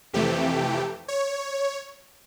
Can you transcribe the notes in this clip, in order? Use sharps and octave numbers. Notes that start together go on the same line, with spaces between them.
F2 C3 E3 A3 G4
C#5